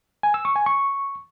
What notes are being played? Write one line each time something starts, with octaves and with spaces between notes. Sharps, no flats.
G#5
E6
C#6
G#5
C#6